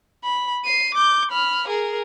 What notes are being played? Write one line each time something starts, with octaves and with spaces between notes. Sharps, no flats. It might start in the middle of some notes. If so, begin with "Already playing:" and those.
B5
C7 D#7
D6 G6
B5 F6
G#4 A#4